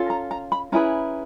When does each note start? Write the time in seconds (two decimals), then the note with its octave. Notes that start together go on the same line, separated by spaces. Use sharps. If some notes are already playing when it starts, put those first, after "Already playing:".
Already playing: C#4 F4 A4
0.10 A#5
0.31 A#5
0.52 B5
0.72 C#4 E4 G#4 B4 A#5